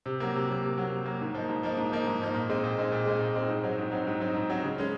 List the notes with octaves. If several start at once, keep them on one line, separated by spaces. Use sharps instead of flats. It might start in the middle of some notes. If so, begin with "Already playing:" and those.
C3
F#3 A#3
C3
F#3 A#3
C3
F#3 A#3
C3
F#3 A#3
G#2
F3 A#3 D#4
G#2
F3 A#3 D#4
G#2
F3 A#3 D#4
G#2
F3 A#3 D#4
A#2
G#3 C4 D#4
A#2
G#3 C4 D#4
A#2
G#3 C4 D#4
A#2
G#3 C4 D#4
G#2
F#3 C4 D#4
G#2
F#3 C4 D#4
G#2
F#3 C4 D#4
G#2
F#3 C4 D#4
C#3
G#3 C#4